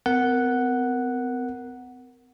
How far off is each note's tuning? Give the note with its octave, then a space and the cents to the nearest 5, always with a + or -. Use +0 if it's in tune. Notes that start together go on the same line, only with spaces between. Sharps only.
C4 -45 A#4 +0 F#5 +0